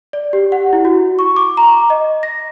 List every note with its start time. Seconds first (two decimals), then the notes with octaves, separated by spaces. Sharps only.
0.13 D5
0.33 G4
0.52 F#5
0.73 E4
0.85 F#4
1.19 C#6
1.36 D6
1.57 A#5
1.90 D#5
2.23 A#6